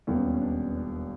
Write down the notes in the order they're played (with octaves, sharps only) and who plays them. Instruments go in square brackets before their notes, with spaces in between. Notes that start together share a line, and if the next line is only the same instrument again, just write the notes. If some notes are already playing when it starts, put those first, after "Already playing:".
[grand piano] E1 D#2 D#3 G3 B3 [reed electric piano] A3
[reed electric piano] C#4
D4
C#4
D4
D4